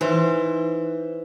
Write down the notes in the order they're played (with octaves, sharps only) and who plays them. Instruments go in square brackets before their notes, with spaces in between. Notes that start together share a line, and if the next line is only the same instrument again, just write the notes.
[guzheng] E3 [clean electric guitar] D#4 C5 C6